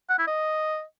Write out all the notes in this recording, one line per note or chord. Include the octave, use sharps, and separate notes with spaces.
F#5
E4
D#5